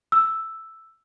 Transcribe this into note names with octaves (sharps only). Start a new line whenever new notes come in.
E6